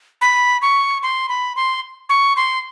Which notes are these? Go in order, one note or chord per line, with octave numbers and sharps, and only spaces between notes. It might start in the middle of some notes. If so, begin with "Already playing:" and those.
B5
C#6
C6
B5
C6
C#6
C6